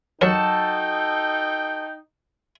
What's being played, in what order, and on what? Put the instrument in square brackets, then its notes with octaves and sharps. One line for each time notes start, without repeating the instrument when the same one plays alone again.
[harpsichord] F#3 A#4 [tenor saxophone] D#4 [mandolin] F#4 A4 A5 [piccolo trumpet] G5